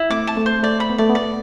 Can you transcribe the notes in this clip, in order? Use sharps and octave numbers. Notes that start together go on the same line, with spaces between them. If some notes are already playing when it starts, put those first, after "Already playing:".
Already playing: E4
A3 C4 D6
A5
A3 C4
C5
A3 D5
B5
B3
A3 D5
B3
D5